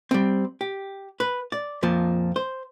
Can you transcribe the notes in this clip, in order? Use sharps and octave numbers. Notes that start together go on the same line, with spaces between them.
G3 C4
G4
B4
D5
F2 A#2 F3
C5